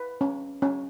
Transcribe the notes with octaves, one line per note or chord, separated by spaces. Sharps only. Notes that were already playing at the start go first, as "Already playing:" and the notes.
Already playing: B4
C#4
C#4